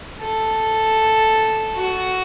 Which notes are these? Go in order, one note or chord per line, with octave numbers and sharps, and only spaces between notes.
A4
F#4